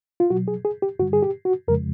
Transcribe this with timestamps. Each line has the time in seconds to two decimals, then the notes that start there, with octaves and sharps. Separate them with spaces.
0.20 F4
0.30 B2 F#3 F#4
0.48 G#4
0.65 G#4
0.82 G4
0.99 G2 D3 G3 F#4
1.13 G#4
1.22 G4
1.45 F#4
1.68 F2 C#3 F3 G#3 A#4